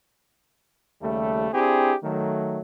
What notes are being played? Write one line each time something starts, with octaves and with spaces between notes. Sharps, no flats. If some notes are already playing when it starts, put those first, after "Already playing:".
D#2 C#3 G3 A3
C4 D4 E4 G4 G#4
D#3 F#3 A3